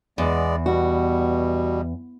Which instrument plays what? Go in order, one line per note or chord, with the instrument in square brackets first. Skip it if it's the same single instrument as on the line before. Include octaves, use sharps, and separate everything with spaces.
[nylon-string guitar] E2 [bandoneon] G#3 B3 D5
[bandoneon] B2 G3 [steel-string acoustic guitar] F#4